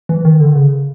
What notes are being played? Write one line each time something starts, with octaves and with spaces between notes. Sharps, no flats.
E3
D#3
D3
C#3